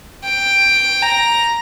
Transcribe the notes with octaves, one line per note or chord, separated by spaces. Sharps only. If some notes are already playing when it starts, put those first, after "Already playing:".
G5
A#5